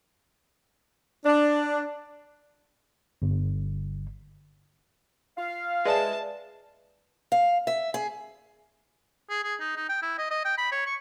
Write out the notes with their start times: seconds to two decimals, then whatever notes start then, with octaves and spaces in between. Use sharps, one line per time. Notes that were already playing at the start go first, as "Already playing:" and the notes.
1.26 D4
3.22 G1
5.38 F4 F5
5.86 G#3 B4 D5 E5 A5 E7
7.32 F5
7.67 E5
7.94 G#4
9.30 G#4
9.44 G#4
9.60 D#4
9.76 D#4
9.89 G5
10.02 E4
10.18 D#5
10.31 D#5
10.45 G5
10.58 B5
10.71 C#5
10.86 C#6